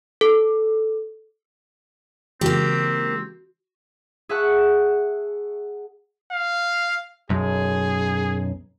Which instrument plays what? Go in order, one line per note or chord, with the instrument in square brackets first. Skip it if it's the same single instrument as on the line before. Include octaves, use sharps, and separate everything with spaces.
[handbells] A4
[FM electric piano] C#3 E3 G#3 [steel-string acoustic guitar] A#3 G4 [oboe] C4 [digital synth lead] F#4
[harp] G#4 E5 F#5 A5 C#6 F#6
[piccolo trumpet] F5
[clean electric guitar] B1 F#2 [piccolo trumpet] G#4